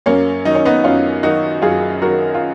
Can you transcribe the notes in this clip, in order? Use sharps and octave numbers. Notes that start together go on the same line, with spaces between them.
F#2 A#3 C#4
D#3 F#3 D#4
C#4
B3 D#4
F#2 C#4 F4
D#3 F#3 D#4 F#4
F#2 F4 G#4
D#3 F#3 F#4 A#4
F4